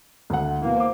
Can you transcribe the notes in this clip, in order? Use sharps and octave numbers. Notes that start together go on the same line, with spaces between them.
D2 F#5
B2 E3 A#3
C5 D6